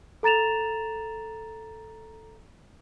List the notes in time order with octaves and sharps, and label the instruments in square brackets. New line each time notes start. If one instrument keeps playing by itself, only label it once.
[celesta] A4 A#5 A6 E7 F7